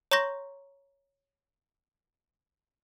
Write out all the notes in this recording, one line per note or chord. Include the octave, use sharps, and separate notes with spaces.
C#5 A#5 C6 C#6 G6 A#6